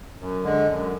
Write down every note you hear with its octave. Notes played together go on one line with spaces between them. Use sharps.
F#2
D3 G#3
F#2